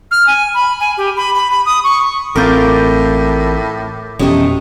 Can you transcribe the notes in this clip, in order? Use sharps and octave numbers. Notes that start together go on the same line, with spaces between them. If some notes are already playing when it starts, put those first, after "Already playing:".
F6
G#5
B5
G#5
G4
B5
B5
B5
D#6
C#6
A1 A2 C4 F4 A#4 D6 G6 A6
F1 B2 E3 G#3 A3 C#4 D#4 G4